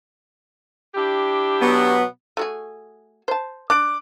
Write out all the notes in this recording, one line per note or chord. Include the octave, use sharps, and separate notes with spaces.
D4 E4 G4
B2 F#3 B3
A3 F#4 G#4
C5 A5
D4 D6 F#6 D7